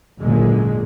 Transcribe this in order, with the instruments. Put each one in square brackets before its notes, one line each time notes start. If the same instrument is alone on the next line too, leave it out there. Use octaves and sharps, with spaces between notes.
[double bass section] G#1 F#2 A#2 D3 G#3 A#3